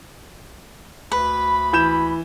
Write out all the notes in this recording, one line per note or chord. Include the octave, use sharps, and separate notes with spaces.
D2 B4 B5
E3 G6 E7